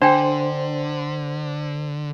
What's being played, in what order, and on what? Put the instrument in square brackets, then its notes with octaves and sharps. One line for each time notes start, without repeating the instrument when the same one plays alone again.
[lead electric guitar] D3 [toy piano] D4 G5 [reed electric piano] C5